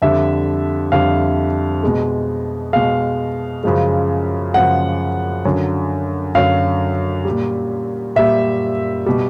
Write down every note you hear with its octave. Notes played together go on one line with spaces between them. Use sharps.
F2 D3 G3 E5
F2 D3 G3 F5
B2 G#3
B2 G#3 F5
F#2 C#3 F3 G#3
F#2 C#3 F3 G#3 F#5
F#2 D3 F#3
F#2 D3 F#3 F5
G3
A#2
A#2 G3 E5
B2 G3